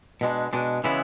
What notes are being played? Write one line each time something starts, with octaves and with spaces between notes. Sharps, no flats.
B2 G#3 D4
B2 G#3 D4
C#3 E3 G#3 B3 E4